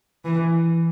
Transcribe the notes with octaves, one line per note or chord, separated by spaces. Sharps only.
E3